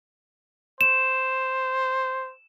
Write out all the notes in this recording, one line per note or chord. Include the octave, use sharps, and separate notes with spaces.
C5 E7